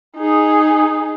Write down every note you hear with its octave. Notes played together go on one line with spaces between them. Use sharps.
D#4 G#4